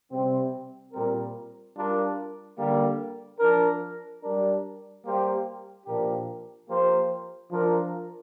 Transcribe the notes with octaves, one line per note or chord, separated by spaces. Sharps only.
C3 G3 C4
A#2 G3 C4 A#4
G3 D4 F4 A#4
D3 G3 A#3
F3 D4 A#4
G3 D4 A#4
G3 A#3 G4 C5
A#2 F3 D4 G4 A#4
F3 A#3 G4 C5
F3 D4 F4 A#4